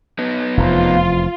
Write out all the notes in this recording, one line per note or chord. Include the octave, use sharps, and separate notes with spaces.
B3 D#4
F1 E2 F3 F4